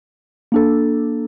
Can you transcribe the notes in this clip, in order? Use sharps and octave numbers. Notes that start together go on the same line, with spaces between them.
A#3 D4 A4